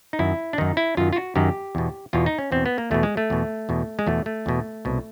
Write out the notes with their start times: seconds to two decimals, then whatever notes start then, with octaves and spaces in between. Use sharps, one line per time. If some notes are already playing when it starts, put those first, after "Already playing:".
0.13 D#4
0.19 F#2 D#3 E4
0.53 D4
0.58 F#2 D#3 D#4
0.77 E4
0.97 F#2 D#3 F4
1.13 F4
1.16 F#4
1.36 F#2 D#3 G4
1.75 E2 B2
2.13 E2 B2 F4
2.26 D#4
2.39 C#4
2.52 E2 B2 C4
2.66 B3
2.78 A#3
2.91 E2 B2 A3
3.03 G#3
3.17 A3
3.30 E2 B2
3.69 E2 B2
3.99 G#3
4.07 E2 B2 A3
4.26 A3
4.46 E2 B2
4.85 C2 B2